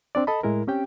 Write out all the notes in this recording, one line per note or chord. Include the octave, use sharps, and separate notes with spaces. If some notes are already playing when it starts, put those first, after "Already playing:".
C4 D4 D5
A4 D#5 A5 B5
A2 G#3 E4 A#4
C4 C#4 G4 G5